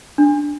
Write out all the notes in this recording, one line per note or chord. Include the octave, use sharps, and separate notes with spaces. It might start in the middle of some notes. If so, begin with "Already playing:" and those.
D4